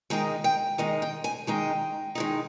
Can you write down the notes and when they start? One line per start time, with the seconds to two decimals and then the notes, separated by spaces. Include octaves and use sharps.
0.10 D#3 G#3 D#4 G5
0.44 G5
0.78 D#3 G#3 D#4 D#5
1.02 G5
1.24 G#5
1.47 D#3 G#3 D#4 G5
2.15 D#3 G#3 D#4